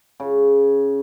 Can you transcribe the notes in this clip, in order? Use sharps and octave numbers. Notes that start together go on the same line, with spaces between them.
C#3